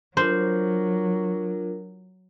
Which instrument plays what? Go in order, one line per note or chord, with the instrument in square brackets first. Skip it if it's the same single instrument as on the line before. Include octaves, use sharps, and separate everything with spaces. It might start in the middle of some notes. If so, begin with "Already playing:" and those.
[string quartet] F#3 [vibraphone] D4 F4 A#4 [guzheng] C5